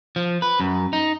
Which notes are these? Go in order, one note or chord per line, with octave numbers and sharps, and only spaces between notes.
F3
B4
F#2
D#4